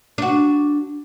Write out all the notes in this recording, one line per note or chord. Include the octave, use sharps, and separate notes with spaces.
D4 F#4